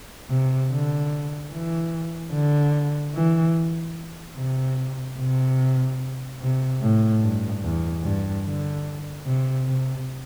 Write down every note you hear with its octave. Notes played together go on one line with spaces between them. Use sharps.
C3
D3
E3
D3
E3
C3
C3
C3
A2
G2
E2
G2
D3
C3
C3